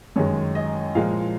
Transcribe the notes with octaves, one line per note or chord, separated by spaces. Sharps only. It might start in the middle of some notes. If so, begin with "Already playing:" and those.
F#2 D#3 G#3 C#5
D#5
A#2 F3 G#3 F5